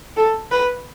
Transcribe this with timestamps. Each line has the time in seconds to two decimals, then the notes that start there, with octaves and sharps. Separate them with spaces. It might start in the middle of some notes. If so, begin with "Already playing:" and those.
0.17 A4
0.52 B4